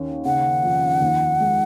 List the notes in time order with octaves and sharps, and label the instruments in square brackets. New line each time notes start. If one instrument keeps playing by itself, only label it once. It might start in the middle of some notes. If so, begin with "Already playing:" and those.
Already playing: [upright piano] D#2 C#4
[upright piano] C#3 [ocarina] F#5
[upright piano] F2
D#2
G#3